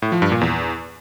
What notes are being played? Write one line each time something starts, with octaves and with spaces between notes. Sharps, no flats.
A2
F3
G2
A#2
E2